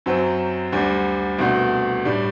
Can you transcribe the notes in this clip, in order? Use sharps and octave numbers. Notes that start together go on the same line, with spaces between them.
F#2 F#3 C4
D2 D3 G3
C2 B2 A3 D4 F#4
A2 G3 D4